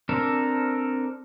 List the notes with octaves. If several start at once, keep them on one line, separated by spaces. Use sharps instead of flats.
C4 D4 A4 A#4